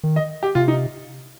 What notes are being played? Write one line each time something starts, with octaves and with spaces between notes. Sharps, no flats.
D#3
D#5
G4
C3 F4
D#4